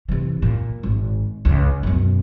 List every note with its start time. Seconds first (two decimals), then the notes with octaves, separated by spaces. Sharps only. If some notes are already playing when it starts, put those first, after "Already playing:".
0.09 C3 E3
0.42 A#2
0.83 G#1
1.45 C#2 C#3
1.83 F#2 B2